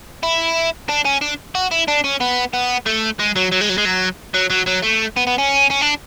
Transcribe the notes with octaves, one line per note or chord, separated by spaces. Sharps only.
E4
D4
C#4
D4
F#4
E4
D4
C#4
B3
B3
A3
G#3
F#3
F#3
G#3
F#3
G#3
F#3
F#3
F#3
F#3
A3
B3
B3
C#4
C#4
D4